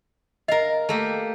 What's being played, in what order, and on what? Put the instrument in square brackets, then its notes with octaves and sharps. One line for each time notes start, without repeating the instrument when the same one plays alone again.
[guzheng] A#4 F5 [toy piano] D#5
[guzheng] A3 A#3 G4